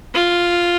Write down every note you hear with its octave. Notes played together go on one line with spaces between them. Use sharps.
F4